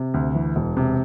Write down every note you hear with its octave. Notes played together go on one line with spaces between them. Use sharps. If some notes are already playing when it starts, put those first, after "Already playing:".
Already playing: C3
D2
E3
E1
C3